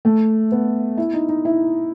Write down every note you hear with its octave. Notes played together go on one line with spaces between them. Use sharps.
A3
B3
E4
D#4
D#4
E4